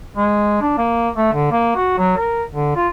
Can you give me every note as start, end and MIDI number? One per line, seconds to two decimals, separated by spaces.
0.17 0.61 56
0.62 0.73 62
0.78 1.09 58
1.16 1.29 57
1.33 1.51 50
1.52 1.74 58
1.76 1.97 66
1.98 2.15 54
2.17 2.43 70
2.50 2.75 50
2.76 2.88 65